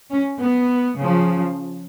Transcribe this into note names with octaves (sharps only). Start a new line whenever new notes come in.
C#4
B3
C#3 F3